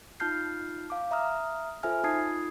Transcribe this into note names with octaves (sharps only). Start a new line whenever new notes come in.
D#4 F4 A5 F6 G6 C7
F5 D6
E5 A#5 D#6 F6
F4 A4 C5 E5 G#5 F6
D#4 F4 A5 D#6 G#6 C7